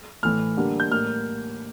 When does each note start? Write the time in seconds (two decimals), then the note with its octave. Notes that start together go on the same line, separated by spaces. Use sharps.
0.23 A2 E3 A3 F6
0.57 D3 G3 A#3
0.80 G6
0.91 A2 G3 A#3 F6